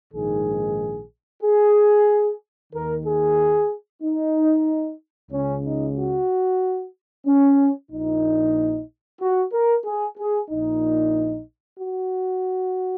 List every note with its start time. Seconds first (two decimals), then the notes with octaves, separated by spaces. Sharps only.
0.13 A#1 G#2 D#3 G#4
1.43 G#4
2.73 D#2 D#3 A#4
3.05 G#4
4.02 D#4
5.31 C#2 C#3 C#4
5.64 D#4
5.96 F#4
7.26 C#4
7.91 A#1 A#2 D#4
9.21 F#4
9.53 A#4
9.85 G#4
10.18 G#4
10.50 A#1 A#2 D#4
11.80 F#4